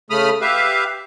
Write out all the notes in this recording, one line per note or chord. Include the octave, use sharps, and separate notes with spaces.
C#3 A3 B5 D#6 F6
G4 B4 E5 F5